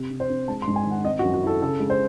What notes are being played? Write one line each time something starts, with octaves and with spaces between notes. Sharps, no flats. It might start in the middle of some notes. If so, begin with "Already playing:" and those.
Already playing: C3
C3
C5
C4
G#3 A5
C6
G#2
G#5
D#3
F#5
C4 D#5
F#4
F#2
F#4
E4 A4
C#3 A4
G#3
C5